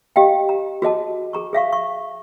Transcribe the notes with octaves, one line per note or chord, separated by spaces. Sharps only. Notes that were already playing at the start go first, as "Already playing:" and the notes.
G4 D#5 F5 G5
A#5
F#4 G#4 D#5 A5
G#4 A#5 C#6
G#4 E5 F5 C#6
C#6